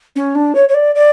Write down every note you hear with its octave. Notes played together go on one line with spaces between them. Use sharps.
C#4
D4
C#5
C#5
D5
D5